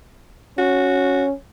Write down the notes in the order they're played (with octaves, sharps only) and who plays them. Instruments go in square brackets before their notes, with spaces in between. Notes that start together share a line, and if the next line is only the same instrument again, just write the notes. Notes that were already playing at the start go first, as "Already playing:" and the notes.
[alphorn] C#4 [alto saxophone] F#4